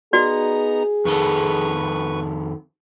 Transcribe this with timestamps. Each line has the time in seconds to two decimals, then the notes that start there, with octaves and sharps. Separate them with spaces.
0.13 B3 D#4 F#4 G#4 D5 A#5
1.05 F2 D#3 A4 B4 C#6